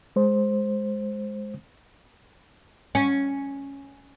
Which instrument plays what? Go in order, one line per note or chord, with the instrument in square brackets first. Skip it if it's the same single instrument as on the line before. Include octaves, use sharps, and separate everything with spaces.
[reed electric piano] G#3 C5
[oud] C#4